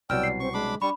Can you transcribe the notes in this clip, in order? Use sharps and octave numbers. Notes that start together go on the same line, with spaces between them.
C2 B2 F#3 D5 G5 E6 F6
C7
C4 C#6
G#3 D4 B5 D6
G3 D4 B5 C#6